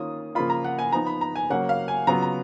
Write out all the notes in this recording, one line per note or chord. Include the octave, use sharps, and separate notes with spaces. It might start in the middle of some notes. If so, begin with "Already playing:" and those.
Already playing: D#3 A#3 C#4 F4 D#6
C#3 F3 A#3 F4 B5
A#5
F#5
G#5
F3 B3 D#4 A#5
B5
A#5
G#5
C#3 F#3 A#3 C#4 F#5
F5
G#5
C#3 F#3 B3 F4 A#5
A#5